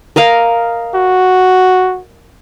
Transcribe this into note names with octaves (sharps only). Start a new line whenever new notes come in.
A#4 D#5 F5
F#4